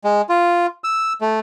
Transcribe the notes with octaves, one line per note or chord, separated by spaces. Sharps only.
G#3
F4
E6
A3